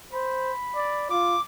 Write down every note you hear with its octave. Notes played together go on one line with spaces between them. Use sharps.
C5 B5
D5
F4 D6